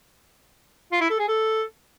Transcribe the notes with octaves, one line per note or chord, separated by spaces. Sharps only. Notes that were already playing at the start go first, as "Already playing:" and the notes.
F4
E4
A4
G#4
A4